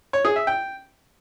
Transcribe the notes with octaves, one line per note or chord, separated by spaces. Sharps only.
C#5
G#4
E5
G5